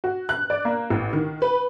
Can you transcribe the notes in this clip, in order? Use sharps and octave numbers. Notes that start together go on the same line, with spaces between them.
F#4
F#6
D5
A#3
A1
D#3
B4